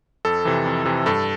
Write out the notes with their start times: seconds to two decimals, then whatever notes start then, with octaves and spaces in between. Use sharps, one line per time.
0.25 F2 A4
0.45 C3 E3
0.66 F2
0.86 C3 E3
1.06 G2 A4